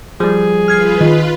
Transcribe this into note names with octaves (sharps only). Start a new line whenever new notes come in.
F3 G3 G#4
F4 B4 F6 G#6 C7
D#3